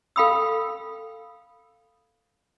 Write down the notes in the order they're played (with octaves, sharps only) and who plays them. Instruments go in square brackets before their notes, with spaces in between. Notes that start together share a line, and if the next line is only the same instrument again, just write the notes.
[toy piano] A4 F5 G5 B5 D#6 E6